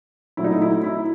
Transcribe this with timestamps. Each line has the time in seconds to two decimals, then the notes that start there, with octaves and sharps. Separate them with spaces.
0.37 A#2 F#3 A3 E4
0.44 D#4
0.52 E4
0.62 E4
0.84 E4